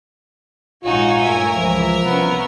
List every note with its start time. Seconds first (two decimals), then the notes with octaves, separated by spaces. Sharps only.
0.84 A#1 G#2 D#4 F4 F#4 C#5 G#5
1.22 G2 A3 A#4 E5
1.55 C#2 E3 F3
2.05 C2 C3 B3 C#4